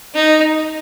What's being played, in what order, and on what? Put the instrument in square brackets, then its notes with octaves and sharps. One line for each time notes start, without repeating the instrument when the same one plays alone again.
[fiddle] D#4